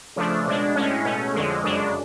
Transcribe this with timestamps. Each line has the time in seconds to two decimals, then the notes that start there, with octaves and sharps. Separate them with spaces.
0.16 C#3 F3 A3 D4
0.46 B2 G#3 D4
0.75 A2 G#3 C#4
1.05 B2 A3 C#4
1.34 F2 D3 G#3
1.64 F#2 C#3 G#3 D4